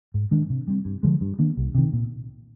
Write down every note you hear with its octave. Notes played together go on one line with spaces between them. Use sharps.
G#2
D#3 G#3 D4
C3
G3 C4
G2
D3 F3 G#3
G2
D#3 A#3 D4
C2
C3 D#3
A#2